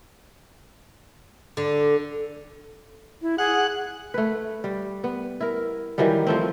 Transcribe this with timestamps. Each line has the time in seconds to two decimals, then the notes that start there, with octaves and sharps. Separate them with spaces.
1.57 D3
3.22 E4
3.38 G#4 F#5
4.14 A3 B4
4.64 G3
5.04 B3
5.40 E4 A#4
5.98 D#3 E3 F#3 G3
6.27 F3 A3 C4